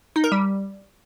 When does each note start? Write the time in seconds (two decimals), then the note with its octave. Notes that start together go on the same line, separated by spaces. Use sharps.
0.16 D#4
0.24 A#4
0.32 G3